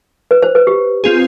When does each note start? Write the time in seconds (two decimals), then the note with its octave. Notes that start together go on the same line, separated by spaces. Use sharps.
0.31 B4
0.42 C5
0.55 B4
0.67 G4
1.04 C4 F4 G#4